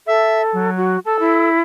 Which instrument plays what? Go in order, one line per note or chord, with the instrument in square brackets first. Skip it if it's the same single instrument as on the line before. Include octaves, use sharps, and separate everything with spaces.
[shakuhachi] A4 [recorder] E5
[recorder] F#3
[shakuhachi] F#4
[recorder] A4 [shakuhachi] A5
[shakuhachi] E4